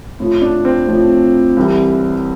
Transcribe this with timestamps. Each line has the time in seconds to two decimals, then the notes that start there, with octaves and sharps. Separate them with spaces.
0.20 A2 F3
0.41 D4
0.65 C4
0.87 A2 F3
1.57 C2 C3 E3 G3